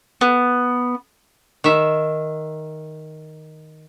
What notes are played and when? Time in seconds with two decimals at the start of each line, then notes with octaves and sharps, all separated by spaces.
0.21 B3
1.64 D#3 E5